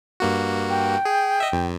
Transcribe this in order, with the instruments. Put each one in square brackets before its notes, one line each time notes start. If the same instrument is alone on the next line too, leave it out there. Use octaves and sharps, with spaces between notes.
[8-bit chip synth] G2 A#3 F#4
[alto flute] G5
[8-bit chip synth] G#4
D#5 E5
F2